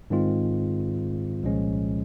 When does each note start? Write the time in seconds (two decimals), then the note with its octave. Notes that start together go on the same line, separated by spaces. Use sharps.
0.10 G#2 D#3 G#3 C4 F4
1.43 C2 A#2 F3 G#3 C#4